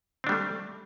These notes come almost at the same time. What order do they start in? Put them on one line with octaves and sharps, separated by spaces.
C4 D4 G3 A3